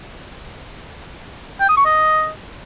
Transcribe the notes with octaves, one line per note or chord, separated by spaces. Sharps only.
G5
D#6
C#6
D#5